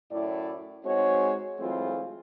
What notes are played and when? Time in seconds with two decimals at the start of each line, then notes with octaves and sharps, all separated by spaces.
0.12 F#2 A2 E4 D5
0.85 G#2 G#3 C4 F#4 C#5
1.59 E3 F#3 G#3 A3 C4 F4